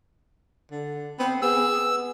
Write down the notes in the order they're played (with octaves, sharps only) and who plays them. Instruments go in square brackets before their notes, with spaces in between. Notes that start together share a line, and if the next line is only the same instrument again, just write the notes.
[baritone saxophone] D3
[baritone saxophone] B3 [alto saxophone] C4
[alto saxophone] B3 [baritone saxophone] G#4 [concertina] E6